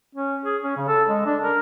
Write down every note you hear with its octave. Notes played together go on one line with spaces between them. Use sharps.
C#4
G#4
C#4
C#3
A4
G#3
D4
A#4